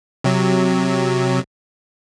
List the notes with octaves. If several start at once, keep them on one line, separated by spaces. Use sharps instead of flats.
C3 F#3